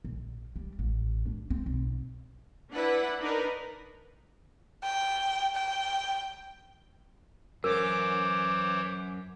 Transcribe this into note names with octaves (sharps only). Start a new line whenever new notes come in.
A#1
G3
A1
D4
C4
B1
D4 E4 B4 F#5
D4 D#4 A#4 B4
G5
G5
F#2 E3 A#4 C5 C#5 D6